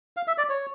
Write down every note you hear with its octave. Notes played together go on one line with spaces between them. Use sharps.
F5
E5
D5
C#5